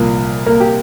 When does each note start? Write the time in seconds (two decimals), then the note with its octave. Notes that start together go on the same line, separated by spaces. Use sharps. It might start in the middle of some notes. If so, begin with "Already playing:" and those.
Already playing: C2 A#2 F3 A#3 A#4
0.46 A#3 A#4
0.60 G4